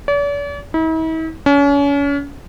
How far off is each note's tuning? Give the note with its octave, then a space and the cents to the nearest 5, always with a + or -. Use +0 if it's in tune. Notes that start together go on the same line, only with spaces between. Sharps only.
D5 -45
E4 -45
C#4 +35